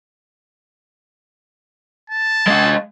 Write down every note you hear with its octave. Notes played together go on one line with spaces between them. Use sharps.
A5
G#3 F5